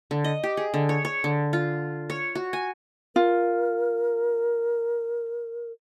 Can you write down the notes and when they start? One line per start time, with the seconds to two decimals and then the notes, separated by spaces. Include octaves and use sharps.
0.11 D3
0.24 D#5
0.43 G4
0.57 G#4
0.74 D3
0.89 C#5
1.05 C#5
1.24 D3
1.53 F4
2.10 C#5
2.35 F#4
2.53 G#5
3.16 F4 A#4